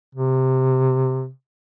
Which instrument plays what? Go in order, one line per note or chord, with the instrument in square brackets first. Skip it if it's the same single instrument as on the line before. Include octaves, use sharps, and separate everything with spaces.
[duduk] C3